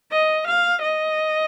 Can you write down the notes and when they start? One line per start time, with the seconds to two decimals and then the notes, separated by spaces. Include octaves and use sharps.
0.12 D#5
0.47 F5
0.82 D#5